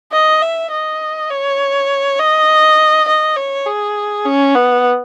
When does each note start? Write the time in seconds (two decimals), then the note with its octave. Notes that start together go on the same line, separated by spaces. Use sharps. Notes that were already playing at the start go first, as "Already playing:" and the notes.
0.12 D#5
0.42 E5
0.71 D#5
1.30 C#5
2.19 D#5
3.08 D#5
3.36 C#5
3.66 G#4
4.25 C#4
4.55 B3